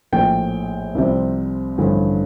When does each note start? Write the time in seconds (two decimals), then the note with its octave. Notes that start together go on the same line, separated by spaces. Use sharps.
0.12 A#1 A2 F3 G5
0.95 C2 C3 F3
1.78 A1 G2 D3 F3